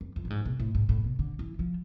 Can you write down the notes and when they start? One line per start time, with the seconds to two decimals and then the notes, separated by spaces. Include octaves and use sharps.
0.01 F2
0.16 F2
0.25 A2
0.30 G#2
0.45 B2
0.60 A2
0.75 G#2
0.89 A2
1.04 B2
1.19 D3
1.39 E3
1.59 F3